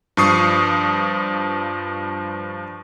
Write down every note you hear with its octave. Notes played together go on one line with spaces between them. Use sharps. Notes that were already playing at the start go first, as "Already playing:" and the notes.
G2 F3 C#6 D#6 C7